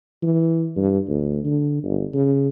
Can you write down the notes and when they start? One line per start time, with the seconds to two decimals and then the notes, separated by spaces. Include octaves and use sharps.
0.22 E3
0.76 G2
1.09 D2
1.45 D3
1.84 G1
2.14 C#3